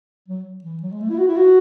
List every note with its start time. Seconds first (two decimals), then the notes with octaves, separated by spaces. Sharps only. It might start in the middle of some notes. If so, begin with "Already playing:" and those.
0.28 F#3
0.64 E3
0.83 F#3
0.92 G#3
1.00 A3
1.10 E4
1.19 F#4
1.27 E4
1.37 F#4